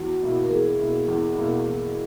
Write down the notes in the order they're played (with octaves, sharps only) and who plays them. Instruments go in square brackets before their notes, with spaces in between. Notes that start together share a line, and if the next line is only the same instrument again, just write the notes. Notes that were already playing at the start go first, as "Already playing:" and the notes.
Already playing: [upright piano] E2 [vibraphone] F#4
[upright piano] B2 A#3 E4
[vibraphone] A#4
[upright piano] E2 [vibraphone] G#4
[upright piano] B2 A#3 E4
E2
B2 A#3 E4
E2